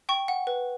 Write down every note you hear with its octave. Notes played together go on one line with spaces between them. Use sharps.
G5 C#6
F#5
B4